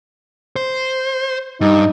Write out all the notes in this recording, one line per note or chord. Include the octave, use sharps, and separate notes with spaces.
C5
G2 D#4